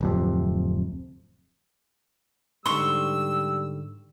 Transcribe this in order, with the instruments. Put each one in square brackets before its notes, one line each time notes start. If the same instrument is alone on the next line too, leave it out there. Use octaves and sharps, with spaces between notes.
[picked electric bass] D1 F2 C3
[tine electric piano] G#2 D3 [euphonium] G3 [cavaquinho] C6 C#6 [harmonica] E6